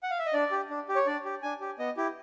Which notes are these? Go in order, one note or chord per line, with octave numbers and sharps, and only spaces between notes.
F#5
F5
E5
D#5
D4 D5
G4
D4
G4
C#5
D4 D5
G4
D4 G#5
G4
B3 D#5
E4 G4